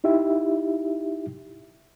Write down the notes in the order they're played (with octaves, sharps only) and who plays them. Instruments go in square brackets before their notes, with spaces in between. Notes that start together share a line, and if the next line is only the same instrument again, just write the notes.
[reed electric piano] D#4 E4 G4 E5